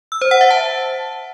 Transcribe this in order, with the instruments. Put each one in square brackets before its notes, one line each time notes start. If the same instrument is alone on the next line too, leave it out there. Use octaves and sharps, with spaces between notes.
[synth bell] E6
C5
F#5
E5
A5